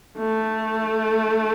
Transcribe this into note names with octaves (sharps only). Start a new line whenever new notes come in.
A3